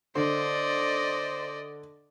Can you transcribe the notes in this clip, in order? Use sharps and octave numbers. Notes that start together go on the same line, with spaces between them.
D3 C5 D5 D#5